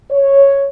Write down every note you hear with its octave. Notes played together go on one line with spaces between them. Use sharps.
C#5